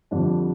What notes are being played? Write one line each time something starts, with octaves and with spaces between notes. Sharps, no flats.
F2 D3 G3 D4